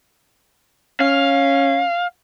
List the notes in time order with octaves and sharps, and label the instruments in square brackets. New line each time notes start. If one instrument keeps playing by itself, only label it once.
[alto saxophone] C#4 [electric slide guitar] F5